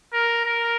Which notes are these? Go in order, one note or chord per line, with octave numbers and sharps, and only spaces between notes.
A#4
A#4